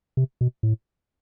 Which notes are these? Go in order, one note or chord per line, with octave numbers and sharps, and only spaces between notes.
C3
B2
A2